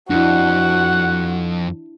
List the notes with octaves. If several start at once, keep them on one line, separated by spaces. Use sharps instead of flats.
F2 D4 E4 F#4 F#5